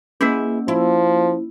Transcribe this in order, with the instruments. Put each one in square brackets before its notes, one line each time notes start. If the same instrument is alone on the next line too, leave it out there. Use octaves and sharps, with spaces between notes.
[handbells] A#3 C#4 [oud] E4 G#4 B4
[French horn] F3 [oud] E4